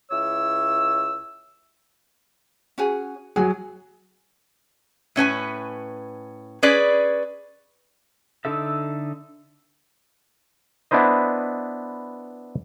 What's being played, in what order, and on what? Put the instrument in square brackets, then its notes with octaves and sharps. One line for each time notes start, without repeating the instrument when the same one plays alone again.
[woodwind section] C#2 E4 C#5 E6
[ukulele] C#4 F#4 G#4
[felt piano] F#3 G#4 [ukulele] F#4
[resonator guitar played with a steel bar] A2 C#4 B4 G#5
C#4 G#4 B4 D5
[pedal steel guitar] D3 D#4 A4 E5
[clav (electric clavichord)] B3 D4 E4 B4 C5 D#5